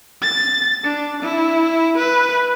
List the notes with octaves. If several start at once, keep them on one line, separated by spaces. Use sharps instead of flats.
A6
D4
E4
B4